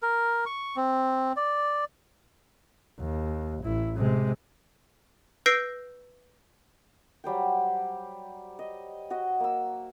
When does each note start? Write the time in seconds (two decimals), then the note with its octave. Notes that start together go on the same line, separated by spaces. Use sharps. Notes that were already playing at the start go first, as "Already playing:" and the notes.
0.03 A#4
0.46 C#6
0.76 C4
1.37 D5
2.99 D#2
3.63 A1 E4
3.96 C3 G#3
5.46 B4 E6 G6 A#6 C7 D7
7.24 F#3 G3 C5 G5
8.59 D#5
9.10 F#4 D#5
9.40 A#3 E6